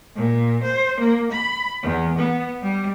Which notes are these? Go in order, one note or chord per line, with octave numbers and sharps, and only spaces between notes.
A#2
C5
A#3
B5
E2
B3
G3